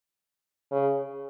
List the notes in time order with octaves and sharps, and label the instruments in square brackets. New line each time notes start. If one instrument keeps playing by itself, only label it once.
[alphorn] C#3